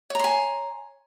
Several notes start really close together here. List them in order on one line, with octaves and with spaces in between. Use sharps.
C#5 A#5 C6 G#5